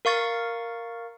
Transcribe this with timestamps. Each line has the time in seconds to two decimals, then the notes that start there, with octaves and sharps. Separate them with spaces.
0.05 A#4 F5 C#6 A6